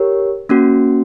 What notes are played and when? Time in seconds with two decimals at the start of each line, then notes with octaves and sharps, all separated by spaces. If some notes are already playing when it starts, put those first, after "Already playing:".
Already playing: G4 A#4 C#5
0.49 A#3 C#4 F#4